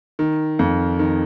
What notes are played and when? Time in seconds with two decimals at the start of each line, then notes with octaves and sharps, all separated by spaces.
0.19 D#3
0.59 F2
0.99 D#3